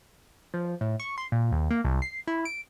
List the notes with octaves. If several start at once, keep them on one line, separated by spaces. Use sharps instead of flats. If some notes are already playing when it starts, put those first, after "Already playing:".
F3
A2
C#6
C6
A#2
D#2
A#3
C2
C7
E4
D7